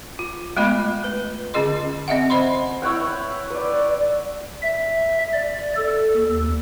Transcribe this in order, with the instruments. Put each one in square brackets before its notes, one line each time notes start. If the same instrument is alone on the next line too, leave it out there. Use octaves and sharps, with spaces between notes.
[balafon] F4
G#3 A3 B3 F4 D#5 B5
B4
D3 C#4 F4 G#4 D#5 C6
C4 D#5 E5 F#5
C5 D#5 B5 C6
[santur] E4 C#5 F#5 G5
B4 D5
[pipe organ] E5
D5
A4
D#2